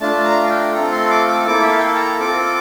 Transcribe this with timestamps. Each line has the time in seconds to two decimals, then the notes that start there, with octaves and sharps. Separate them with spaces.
0.01 A3 D4 F4 A5
0.25 A#5
0.44 F5
0.49 G5
0.73 A3 C4 F4 A4 A#5
0.92 C6
1.10 D6
1.28 D6
1.46 A#3 E4 A4 D6
1.62 E5
1.70 F5
1.79 G5
1.87 A5
1.95 A#5
2.20 C4 F4 A4 D6